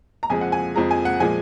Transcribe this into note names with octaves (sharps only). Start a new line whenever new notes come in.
A#5
F2 F3 G#3 G#5
F#5
G#5
F2 F3 G#3 A#5
G#5
F#5
A#2 F3 G#3 G#5